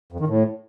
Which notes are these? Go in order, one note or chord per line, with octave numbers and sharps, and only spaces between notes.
F2
D#3
A2